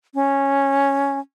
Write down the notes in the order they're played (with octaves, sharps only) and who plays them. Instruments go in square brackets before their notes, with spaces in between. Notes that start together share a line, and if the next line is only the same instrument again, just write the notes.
[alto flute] C#4